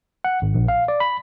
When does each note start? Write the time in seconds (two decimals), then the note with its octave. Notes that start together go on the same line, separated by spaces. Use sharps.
0.24 F#5
0.42 G#1
0.54 A#1
0.68 F5
0.88 D5
1.00 B5